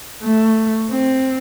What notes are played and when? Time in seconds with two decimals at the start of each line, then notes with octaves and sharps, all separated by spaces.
0.23 A3
0.91 C4